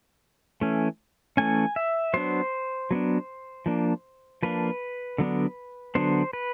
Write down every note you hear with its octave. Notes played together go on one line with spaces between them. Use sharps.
E3 A3 C#4
E3 A3 C#4 G#5
E5
F#3 B3 D4 C5
F#3 B3 D4
F3 A#3 D4
F3 A#3 D4 B4
D3 F#3 B3 D4
D3 F#3 B3 D4 C5
B4